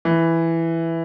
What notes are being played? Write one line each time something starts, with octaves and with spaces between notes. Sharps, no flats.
E3